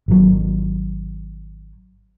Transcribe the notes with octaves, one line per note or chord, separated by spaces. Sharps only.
G#1 F#3